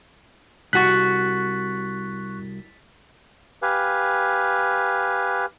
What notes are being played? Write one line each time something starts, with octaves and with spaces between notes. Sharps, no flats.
C2 F#4 C#6 F#6 A6 B6
G4 B4 F5 G#5